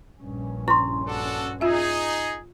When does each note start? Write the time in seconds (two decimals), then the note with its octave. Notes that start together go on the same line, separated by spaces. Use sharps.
0.19 A#1 G2 C#4
0.68 E4 C6 C#6
1.07 D4 F#4 A4
1.61 D#4 F4 G#4 E5